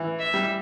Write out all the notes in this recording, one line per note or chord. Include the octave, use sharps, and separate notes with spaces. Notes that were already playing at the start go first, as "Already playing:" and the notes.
Already playing: E3
E5
G3